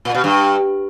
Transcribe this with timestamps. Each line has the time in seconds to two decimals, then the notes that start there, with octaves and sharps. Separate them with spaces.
0.05 A#2
0.15 B2
0.24 G2